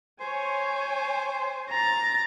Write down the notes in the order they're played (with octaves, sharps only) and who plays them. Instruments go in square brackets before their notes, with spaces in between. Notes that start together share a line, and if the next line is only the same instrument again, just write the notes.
[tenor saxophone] C5 [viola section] C#5 G#5
[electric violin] A#5 A6